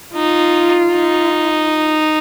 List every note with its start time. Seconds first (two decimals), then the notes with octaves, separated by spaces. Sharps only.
0.15 D#4 F4
0.94 D#4